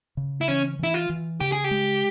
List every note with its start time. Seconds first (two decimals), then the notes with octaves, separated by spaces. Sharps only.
0.17 C#3
0.41 E4
0.48 E3 C#4
0.79 E3 E4
0.94 F4
1.09 E3
1.40 C#3 G4
1.52 G#4
1.64 G4
1.71 G#3